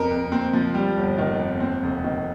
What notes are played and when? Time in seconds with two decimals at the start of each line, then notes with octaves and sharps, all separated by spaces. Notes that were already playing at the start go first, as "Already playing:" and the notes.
Already playing: F2 A#4
0.11 F2
0.32 C4
0.53 F3
0.74 G3
0.97 G1
1.18 D#3
1.39 F2
1.60 C4
1.83 F1
2.04 D#3